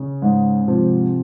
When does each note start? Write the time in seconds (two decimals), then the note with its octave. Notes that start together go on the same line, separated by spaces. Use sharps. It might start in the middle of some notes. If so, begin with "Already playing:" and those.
Already playing: C#3
0.22 G#2
0.68 C3 F3